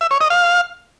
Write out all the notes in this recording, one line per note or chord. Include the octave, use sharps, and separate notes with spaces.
E5
C#5
D#5
F5